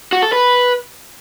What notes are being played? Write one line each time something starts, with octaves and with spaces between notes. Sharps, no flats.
F#4
A4
B4